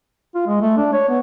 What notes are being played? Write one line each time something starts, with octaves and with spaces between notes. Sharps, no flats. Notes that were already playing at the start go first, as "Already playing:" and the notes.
F4
G#3
A3
D4
C#5
B3